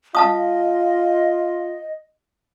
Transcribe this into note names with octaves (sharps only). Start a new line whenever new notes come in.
F4 D#5 F5 A5 D#6